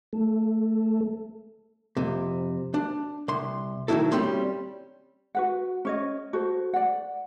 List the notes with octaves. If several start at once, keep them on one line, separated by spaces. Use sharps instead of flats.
A3
F2 C3
D4
C2 C6
D#3 F#3 G3 D4 E4 A4
G3 C4 C#4 C6
F#4 B4 F#5
C#4 C#5 D#5
F#4 A4 C5
D5 F#5